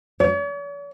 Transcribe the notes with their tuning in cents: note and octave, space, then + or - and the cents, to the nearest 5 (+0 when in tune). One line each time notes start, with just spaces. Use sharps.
C#5 +45